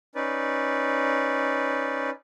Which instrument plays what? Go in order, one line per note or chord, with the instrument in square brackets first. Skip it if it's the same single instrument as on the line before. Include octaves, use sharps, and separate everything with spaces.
[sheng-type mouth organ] C#4 D#4 B4 D5